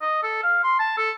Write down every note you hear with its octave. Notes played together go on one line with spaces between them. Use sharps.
D#5
A4
F5
C6
A5
A4